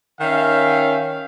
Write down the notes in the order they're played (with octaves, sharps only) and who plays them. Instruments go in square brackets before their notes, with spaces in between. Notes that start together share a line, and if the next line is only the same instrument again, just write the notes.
[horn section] D#3 C#4 E5 F5